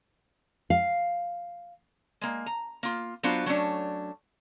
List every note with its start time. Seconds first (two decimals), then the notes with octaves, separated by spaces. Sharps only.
0.70 F5
2.21 G#3 A#3
2.46 A#5
2.83 A#3 F4
3.23 F#3 B3 D4 F4 F#4 C5
3.46 F#3 A3 C#4 D4